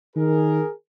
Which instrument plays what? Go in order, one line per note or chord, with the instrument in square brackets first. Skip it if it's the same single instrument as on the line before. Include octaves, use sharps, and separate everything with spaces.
[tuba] D#3 [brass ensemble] G#4 A#4